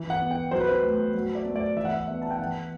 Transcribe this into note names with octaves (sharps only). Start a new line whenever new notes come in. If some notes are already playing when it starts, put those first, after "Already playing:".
Already playing: E3
F#5
B3
G5
F#3 C5
B4
C5
A3
F#3
D5
A3
D5
E3 E5
F#5
E5
B3 E5
A5
G5
E3 F#5